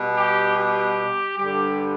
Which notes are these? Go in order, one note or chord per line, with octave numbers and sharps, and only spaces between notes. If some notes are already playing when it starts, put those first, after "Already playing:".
Already playing: B2 G3
G4
G4
G2 D3 G3 G4